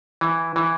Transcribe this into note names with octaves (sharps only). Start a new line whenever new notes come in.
E3
E3